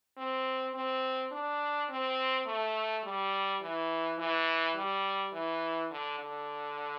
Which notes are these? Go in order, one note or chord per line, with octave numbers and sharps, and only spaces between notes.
C4
C4
D4
C4
A3
G3
E3
E3
G3
E3
D3
D3